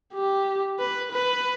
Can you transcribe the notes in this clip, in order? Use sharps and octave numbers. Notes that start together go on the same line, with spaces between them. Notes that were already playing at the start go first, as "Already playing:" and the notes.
G4
B4
B4